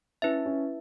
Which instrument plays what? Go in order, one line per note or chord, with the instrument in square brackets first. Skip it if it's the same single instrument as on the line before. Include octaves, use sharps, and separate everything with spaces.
[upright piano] C#4 [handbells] E4 B4 E5
[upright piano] C#4